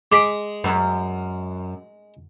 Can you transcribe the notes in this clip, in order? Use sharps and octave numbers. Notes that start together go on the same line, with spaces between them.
G#3 G#4 D6 B6 D7
F#2